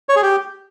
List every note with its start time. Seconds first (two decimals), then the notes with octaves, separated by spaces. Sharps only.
0.09 C#5
0.16 G#4
0.23 G4